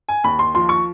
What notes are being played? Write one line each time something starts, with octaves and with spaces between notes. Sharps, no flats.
G#5
D#2 B5
C6
F3 C6
C#6